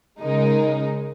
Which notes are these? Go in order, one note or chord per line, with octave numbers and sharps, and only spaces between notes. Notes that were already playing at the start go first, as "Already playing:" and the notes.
C#3 G#3 D#4 A#4